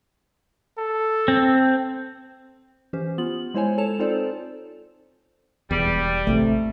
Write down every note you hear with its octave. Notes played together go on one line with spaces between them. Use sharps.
A4
C4
E3 C#4 G4 C5
B3 F4 F#7
G#3 E4 C5 C#5 G#5
A4 C#5 A5 E7 F7
C4 D#4 F4 A4 C5 D5
E1 E2 G3
A1 C3 A3